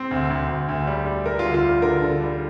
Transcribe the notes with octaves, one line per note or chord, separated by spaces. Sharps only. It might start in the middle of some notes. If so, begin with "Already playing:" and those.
Already playing: C4
D2
D2
D2
D2
G3
G3
G3 A#4
F4
D2
F4
G3
D3 A#4
D3
G3